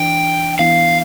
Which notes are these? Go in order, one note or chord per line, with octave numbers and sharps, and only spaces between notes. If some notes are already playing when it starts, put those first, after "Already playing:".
Already playing: E3 D4 G5
E3 B3 E4 F5